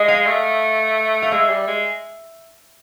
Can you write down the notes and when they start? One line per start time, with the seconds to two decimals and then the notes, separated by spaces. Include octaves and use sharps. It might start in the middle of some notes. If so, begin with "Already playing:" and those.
Already playing: G#3 D#5
0.08 F5
0.26 A3
1.22 F5
1.32 G#3 E5
1.50 G3
1.67 G#3